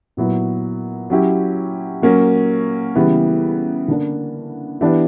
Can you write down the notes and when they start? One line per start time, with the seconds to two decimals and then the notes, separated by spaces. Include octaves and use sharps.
0.17 A#2 F#3 B3 E4
1.10 F#3 C#4 E4 G4
2.02 F#3 A#3 C#4
2.95 C#3 E3 G3 B3
3.88 D3 A#3 D4
4.81 E3 B3 D4 G4